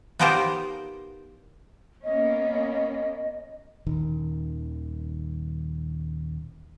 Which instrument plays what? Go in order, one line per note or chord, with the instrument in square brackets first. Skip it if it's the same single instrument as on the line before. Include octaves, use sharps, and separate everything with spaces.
[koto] B3 D#4 F4 G4 A#4 C5
[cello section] A#3 B3 C#4 [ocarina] D#5
[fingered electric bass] D#1 D#3